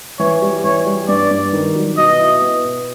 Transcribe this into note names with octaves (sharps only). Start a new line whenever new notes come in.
E3 C#5
G3
E3 C#5
G3
G2 D5
G2
D#3
F#3
B2 D#5
E4
B3
B2